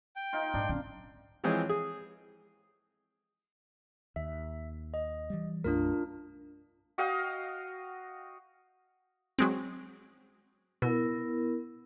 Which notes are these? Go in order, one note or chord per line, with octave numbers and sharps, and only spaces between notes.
G5
D#4 F4
G#2 D4
C4 C#4
E3 F3 G#3 C4 G#4 C#5
G#4
D#2 E5
D#5
E3 G3
B1 F#2 A3 D4 F4 A#4
F#4 D#5 F5 G5
F#3 G#3 C4
B2 B3 E4 A#4